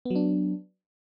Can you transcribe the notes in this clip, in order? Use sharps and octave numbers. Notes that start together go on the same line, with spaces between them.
F#3 B3 D4